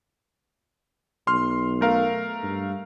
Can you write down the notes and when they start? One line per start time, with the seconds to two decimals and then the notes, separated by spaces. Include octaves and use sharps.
1.27 B1 C6 F6
1.81 A3 A#4 F5
2.43 G2